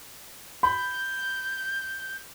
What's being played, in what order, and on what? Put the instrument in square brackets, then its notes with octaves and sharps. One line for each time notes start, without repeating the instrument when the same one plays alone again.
[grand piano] B5 [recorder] G6